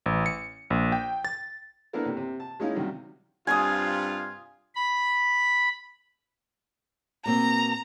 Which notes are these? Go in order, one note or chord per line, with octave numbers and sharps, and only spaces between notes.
A1
C#7
A#1
G5
A6
A#3 B3 D4 E4 A4 A#4
C3
C3
A5
G#3 C#4 D#4 E4 F5
C3 D#3 F#3 G3
G2 C3 F4 G#5 D#6
B5
B2 A#3 C4 A#5